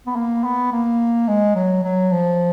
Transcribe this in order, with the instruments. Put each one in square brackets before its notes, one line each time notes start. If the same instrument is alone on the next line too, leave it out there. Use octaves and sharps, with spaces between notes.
[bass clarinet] B3
A#3
B3
A#3
G#3
F#3
F#3
F3